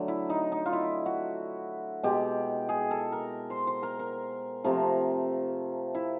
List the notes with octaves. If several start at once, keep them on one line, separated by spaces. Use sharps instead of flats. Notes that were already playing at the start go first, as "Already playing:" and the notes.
Already playing: D3 F#3 A3
E4
D#4
D#4
F4
E4
F#4
B2 G#3 G4
G#4
A4
A#4
C5
C5
A#4
A#4
C3 F3 A3 A#4
E4